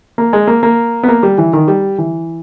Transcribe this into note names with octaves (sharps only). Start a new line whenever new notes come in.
A#3
G#3
A#3
A#3
B3
A#3
G3
E3
D#3
G3
E3